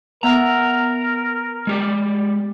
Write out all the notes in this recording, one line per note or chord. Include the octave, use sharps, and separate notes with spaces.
B3 A#4 E5 F#5 A#5
G#3 G4 D5